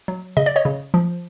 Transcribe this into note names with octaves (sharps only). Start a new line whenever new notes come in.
F#3
C#3 D#5
D5
C#5 D#5
C#3
F3